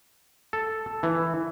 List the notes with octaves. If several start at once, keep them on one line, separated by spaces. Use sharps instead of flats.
A4
E3